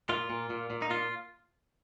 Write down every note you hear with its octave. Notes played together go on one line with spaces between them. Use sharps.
A#2 F4
A#2
A#2
A#2
D#4
A#2 F4